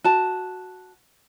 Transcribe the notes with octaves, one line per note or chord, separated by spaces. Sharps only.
F#4 A5